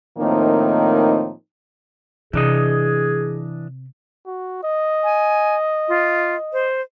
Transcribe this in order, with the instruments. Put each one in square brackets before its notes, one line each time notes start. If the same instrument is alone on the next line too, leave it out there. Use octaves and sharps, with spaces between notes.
[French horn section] A2 D#3 F3 A#3 C4 D#4
[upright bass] C3 [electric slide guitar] E3 D4 D#5 [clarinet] G#4
[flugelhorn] F#4
D#5
[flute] G#5
F4
C5